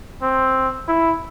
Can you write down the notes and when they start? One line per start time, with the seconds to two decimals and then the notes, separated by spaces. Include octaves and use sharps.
0.22 C4
0.88 E4